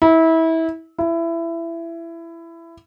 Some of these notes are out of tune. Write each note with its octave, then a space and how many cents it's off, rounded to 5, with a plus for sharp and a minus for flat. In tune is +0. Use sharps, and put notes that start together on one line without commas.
E4 -25
E4 +20